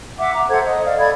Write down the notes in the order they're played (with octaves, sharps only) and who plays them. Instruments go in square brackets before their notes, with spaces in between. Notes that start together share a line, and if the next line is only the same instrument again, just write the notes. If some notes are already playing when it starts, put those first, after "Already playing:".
[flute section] E5 F#5 D6
A#5
A4 C5 F#5 G#6
D#5
D5 F5
A4 D5 B5 G#6